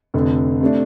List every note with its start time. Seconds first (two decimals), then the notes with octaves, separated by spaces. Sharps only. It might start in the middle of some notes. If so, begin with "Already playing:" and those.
0.14 F1 F2 D3
0.61 C3 A3 D4